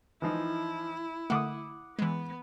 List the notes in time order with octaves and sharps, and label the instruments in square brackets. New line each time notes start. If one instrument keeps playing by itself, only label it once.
[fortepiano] E3 F3 D#4 [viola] E4
[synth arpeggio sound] D3 A3 [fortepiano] F#5 D6 D#6
[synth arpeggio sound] E3 G#3 [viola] B3